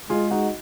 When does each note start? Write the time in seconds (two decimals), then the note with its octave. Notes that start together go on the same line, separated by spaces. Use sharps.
0.10 G#3 F4 G#4
0.31 D#4 F#4